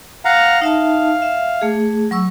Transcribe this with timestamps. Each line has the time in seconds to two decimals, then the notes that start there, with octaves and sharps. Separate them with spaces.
0.25 F5 F#5 A#5
0.61 D#4 E5 F5 A5
1.22 E5
1.61 A3 G#4
2.11 F#3 C#6 E6